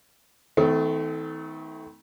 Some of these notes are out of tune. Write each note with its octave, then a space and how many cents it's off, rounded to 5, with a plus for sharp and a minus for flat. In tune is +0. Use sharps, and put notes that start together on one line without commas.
D#3 +40 A3 -5 C4 -40